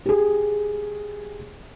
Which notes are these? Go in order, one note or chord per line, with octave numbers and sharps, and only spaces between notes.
G4 G#4